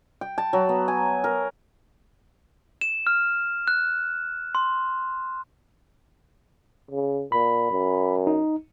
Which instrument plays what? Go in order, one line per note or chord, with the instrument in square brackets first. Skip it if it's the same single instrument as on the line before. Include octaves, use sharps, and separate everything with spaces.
[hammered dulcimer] G5
A5
F#3
B3
G#5
A#4
[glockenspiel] E7
F6
F#6
C6
[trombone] C#3
[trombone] A#2 [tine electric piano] B5
[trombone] F#2
[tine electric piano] D#4